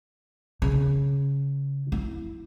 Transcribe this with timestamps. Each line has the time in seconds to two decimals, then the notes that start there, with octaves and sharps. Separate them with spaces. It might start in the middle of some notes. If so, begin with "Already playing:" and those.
0.62 C#3
1.92 E4